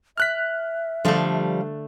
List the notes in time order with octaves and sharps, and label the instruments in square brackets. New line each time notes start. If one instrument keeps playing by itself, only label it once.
[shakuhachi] E5 [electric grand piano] F6 F#6 B6
[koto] D3 A3 [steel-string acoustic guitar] F3 G3 F5